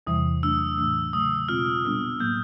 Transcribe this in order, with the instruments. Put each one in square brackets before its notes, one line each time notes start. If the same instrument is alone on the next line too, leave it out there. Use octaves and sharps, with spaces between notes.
[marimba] E2 C3 E3 G3 [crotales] D#6
[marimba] F#3 A3 D4 [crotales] E6
[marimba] A2 E3 A3 D4
[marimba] C#3 F#3 A3 [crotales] D#6
[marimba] B2 G#3 C4 F4 [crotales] F6
[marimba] A#2 G3 B3 D4
[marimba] A2 F#3 A#3 [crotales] G6